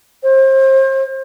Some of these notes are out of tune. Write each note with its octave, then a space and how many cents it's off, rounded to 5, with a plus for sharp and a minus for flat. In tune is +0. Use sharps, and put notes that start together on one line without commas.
C5 +35